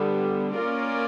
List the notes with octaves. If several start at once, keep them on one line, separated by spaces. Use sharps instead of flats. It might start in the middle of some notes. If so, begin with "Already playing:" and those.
Already playing: D3 G3 B3
A#3 C#4 F4 A#4 D5